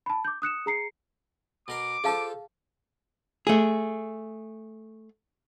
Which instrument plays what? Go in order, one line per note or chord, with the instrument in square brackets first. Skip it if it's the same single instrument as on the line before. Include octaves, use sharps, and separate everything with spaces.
[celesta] A5 B5
D6 G6
D#6 F#6 C#7 E7
G#4 A#5 C7 C#7
[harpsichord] B2 A#4 C6 [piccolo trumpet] D6
[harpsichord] F4 A4 C5 [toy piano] G#4 F5 A5
[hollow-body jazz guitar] A3 G#4